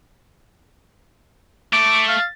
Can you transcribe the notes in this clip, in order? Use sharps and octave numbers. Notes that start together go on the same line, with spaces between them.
A3 D6
F5